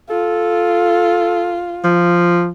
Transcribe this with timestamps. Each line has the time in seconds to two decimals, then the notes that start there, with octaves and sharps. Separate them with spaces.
0.10 F4 A4
1.84 F3